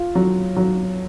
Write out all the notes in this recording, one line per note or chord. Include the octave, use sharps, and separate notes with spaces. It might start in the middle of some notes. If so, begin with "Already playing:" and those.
Already playing: F4
F#3
F#3